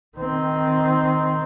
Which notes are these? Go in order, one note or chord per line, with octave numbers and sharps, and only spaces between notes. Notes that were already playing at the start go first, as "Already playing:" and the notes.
D#3 C4